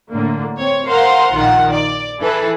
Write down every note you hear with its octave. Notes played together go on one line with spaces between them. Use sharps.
A2 D3 A#3
C4 C#5
A#4 C5 F5 F#5 A#5 C6
A#1 D#3 F4 F#5
D5
E3 E4 G#4 A4 B4